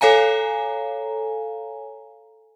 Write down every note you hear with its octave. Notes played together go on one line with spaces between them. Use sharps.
A4 C#5 F5 G#5 A#5